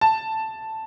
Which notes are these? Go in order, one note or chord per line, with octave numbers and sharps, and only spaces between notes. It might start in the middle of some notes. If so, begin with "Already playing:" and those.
A5